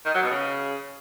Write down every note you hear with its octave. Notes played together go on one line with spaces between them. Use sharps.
D#3
F#3
B2
C#3